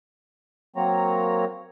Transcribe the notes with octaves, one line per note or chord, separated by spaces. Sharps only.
F#3 A#3 C4 C#5 A#5